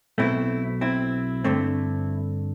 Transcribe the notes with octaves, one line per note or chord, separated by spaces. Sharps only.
B1 B2 A3 C4 E4
C4 E4
G2 D3 A3 C4